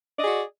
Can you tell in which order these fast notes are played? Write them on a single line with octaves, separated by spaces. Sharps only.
D5 D#5 G#4 F#4